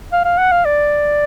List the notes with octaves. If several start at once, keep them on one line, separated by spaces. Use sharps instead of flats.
F5
F5
F#5
F5
D5